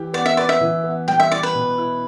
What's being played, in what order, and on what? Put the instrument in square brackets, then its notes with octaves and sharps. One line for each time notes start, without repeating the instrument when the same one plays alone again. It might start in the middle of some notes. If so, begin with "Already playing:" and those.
Already playing: [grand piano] E3 E4 G4
[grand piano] B3 [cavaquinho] D5
[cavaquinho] E5
[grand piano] B4 [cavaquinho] D5
[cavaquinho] E5
[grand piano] E3
B3
[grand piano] G3 [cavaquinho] G5
[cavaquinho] E5
[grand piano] E4 [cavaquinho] D5
[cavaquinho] B4
[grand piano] B2
E4